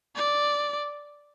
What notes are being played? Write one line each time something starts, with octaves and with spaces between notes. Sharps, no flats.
D5